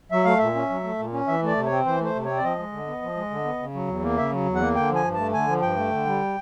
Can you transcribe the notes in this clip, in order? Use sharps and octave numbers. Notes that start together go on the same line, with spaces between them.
F#3 E5
A3 F5
A#2 E5
C#4
F#3
A3
A#2
C#4
E3 E5
A3 D5
C3
C#5
C4
E3 C5
A3 C5
C3
C4 C#5
D5
F3 D#5
G#3
D3
B3
F3
G#3
D3
B3
C#3
F#3
E2
A#3
C#3 E5
F#3
E2
F#5
A#3
D3 G5
F3
G#5
G2
A3 A5
D3 G#5
F3
G2 G5
A3
D3
G3